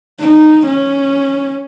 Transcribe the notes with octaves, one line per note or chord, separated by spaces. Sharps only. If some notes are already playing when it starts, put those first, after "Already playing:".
D#4
C#4